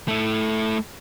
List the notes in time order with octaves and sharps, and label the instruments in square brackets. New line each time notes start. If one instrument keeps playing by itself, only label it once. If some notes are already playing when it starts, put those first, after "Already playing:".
[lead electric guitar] A3 E4